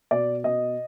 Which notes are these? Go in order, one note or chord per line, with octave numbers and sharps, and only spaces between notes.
B2 D5
B2 D#5